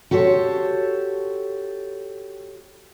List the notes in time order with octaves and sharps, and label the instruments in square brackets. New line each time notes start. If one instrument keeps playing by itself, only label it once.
[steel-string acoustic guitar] F#4 G4 A4 C5 C#5